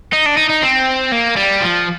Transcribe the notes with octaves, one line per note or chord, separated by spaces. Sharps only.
D#4
D4
D#4
D#4
C4
A#3
G3
F3